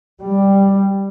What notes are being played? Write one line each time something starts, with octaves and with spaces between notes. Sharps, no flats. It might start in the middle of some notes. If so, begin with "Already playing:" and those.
G3